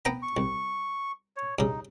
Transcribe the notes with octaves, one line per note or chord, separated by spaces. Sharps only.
B3 G5 A#5
C#6
C2
C#5
G2 C#3 D#4